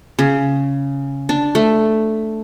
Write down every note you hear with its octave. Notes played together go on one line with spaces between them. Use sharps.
C#3
D4
A3